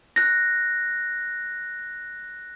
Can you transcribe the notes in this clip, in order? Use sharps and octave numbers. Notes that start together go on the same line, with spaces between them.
F#6 A#6